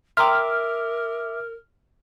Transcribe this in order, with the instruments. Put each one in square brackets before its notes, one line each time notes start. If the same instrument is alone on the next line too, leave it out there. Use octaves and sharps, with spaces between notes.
[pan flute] A#4 [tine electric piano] E5 D6 [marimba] G5 A#5 C6 [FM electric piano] F6